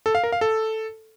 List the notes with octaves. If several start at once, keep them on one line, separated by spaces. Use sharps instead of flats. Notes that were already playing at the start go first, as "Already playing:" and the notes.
A4
F5
A#4
F5
A4